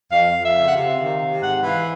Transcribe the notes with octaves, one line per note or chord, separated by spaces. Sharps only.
F2 F5
F2
E5
C#3
F#5
C3 F5
D#3
C3
G#2 F#5
E3 F5